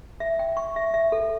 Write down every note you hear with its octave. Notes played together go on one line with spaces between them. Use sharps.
E5
G5
C#6
E5
E5
A4